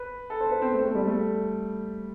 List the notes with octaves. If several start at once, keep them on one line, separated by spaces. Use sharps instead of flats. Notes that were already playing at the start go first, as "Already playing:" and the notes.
Already playing: B4
A4
C5
B4
C4
A3
A3
G3
A3